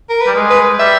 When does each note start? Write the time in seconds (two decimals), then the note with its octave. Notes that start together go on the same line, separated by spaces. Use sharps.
0.09 A#4
0.21 B4
0.27 G3
0.35 G#3
0.50 B4
0.79 G3 E5